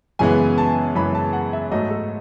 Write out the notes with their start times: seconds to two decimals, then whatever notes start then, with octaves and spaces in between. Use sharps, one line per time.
0.19 F#2 C#3 E3 G#3 B3 G#5
0.58 A5
0.95 F#2 C#3 E3 G#3 B3 B5
1.15 A5
1.33 F#5
1.53 E5
1.72 G#2 F#3 A3 D#5
1.91 A4